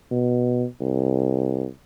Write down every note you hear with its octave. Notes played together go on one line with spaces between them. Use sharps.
B2
C2